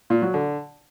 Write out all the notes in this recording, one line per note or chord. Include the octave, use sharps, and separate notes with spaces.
A#2
F#3
D3